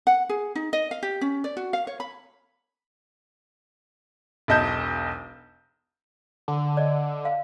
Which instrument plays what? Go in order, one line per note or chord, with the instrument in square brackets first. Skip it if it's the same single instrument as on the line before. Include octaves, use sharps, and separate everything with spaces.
[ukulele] F#5
G#4
D#4
D#5
F5
G4
C#4
D5
F#4
F5
C#5
B5
[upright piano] E1 B1 D#5 A5 G6 E7
[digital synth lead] D3
[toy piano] D5 D#5
F5